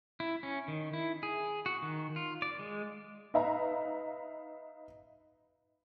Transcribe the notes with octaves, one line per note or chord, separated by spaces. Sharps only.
E4
C#4
D#3
E4
G#4
F#4
D#3
F4
D5
G#3
D#4 B4 E5 F5 A#5